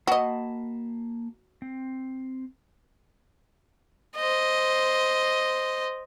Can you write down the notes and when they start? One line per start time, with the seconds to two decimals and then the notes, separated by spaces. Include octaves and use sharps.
0.07 A#3 F#4 D#5 A5 B5
1.62 C4
4.16 C5 D#5